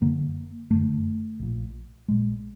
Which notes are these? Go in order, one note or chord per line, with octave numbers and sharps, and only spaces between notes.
F#1 F#2 D3 A#3
F#1 F#2 D3 A3
A#1 A#2
A#1 A#2 G#3